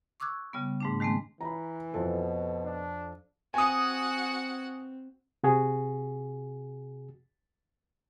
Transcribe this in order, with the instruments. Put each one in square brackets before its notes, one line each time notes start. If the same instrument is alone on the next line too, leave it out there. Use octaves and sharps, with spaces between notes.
[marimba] C#6 D6 E6 F#6 G#6
C#3 G3 B3
G#2 A3 D4
D#3 G#3 A3 B3 C4
[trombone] E3 [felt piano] A#5 B5
[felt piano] F2 A4 [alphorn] B2
[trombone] D4
[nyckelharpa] C4 [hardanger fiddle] F#4 F#5 [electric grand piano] G#5 D#6
[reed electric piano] C3 F#4 G#4